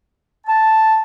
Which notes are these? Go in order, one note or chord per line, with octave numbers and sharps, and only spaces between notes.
A5